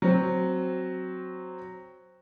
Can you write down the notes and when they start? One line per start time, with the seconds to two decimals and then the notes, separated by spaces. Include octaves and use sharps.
0.02 F#3 C4